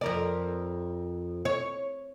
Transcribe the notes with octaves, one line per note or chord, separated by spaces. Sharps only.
F2 A#4 D5
C#5